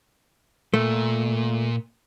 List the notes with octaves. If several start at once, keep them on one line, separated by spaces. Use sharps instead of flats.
A#2 A3